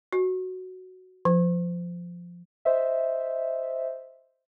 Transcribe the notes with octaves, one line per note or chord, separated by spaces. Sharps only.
F#4
F3
C5 D#5 E5